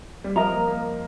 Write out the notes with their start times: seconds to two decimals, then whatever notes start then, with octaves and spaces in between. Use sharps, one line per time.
0.24 G3
0.36 F3 A#4 D#5 A#5
0.52 A#3
0.68 A#3